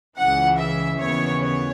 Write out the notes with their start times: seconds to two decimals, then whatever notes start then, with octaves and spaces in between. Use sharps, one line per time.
0.18 C#2 C#3 E3 F#5
0.59 E5
1.00 D#2 C#3 E3 B3 C#5
1.42 C#5